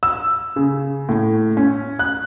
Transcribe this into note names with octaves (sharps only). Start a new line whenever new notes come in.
E6
C#3
A2
C#4
F#6